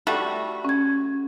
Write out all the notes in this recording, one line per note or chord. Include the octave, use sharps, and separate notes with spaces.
G3 A3 F#4
C#4 G#6